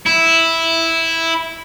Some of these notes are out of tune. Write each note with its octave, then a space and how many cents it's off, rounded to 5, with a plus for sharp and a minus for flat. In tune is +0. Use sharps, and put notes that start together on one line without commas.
E4 -5